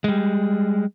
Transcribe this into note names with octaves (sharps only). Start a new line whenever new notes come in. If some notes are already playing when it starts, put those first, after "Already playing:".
G3 G#3